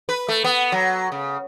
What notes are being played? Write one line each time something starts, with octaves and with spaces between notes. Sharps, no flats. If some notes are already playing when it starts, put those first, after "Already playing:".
B4
A3
B3
F#3
C#3